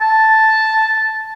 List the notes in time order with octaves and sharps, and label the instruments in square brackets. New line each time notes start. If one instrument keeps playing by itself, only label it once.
[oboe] A5